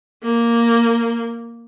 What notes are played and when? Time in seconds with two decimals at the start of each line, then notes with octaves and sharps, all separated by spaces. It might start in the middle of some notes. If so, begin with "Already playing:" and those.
0.23 A#3